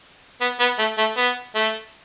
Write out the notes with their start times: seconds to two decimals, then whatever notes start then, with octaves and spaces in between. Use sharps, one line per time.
0.41 B3
0.60 B3
0.79 A3
0.98 A3
1.17 B3
1.55 A3